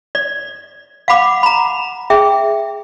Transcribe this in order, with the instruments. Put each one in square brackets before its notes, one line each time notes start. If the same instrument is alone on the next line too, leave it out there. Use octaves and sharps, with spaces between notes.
[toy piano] D5
F5 F#5 B5 D6
A#5 B5
G#4 E5 G5